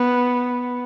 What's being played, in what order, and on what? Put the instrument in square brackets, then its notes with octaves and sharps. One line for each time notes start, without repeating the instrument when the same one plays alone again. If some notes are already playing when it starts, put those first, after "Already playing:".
Already playing: [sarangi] B3